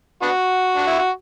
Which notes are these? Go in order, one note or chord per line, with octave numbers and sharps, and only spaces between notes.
B3 D4 F#4
D4
E4
F#4